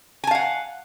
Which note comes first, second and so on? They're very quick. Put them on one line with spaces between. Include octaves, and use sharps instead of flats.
G#5 A5 F5 F#5